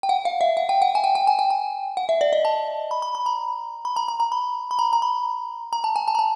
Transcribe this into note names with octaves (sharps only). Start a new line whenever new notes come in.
G5
F#5
F5
E5
F#5
G5
F#5
G#5
G5
G5
G#5
G5
G#5
F#5
E5
D5
D#5
A5
B5
B5
B5
A#5
B5
A#5
A#5
A#5
B5
B5
A#5
A#5
B5
A#5
A5
G#5
A5
A#5
A5